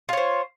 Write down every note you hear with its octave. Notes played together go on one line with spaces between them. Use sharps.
F4 C5 C#5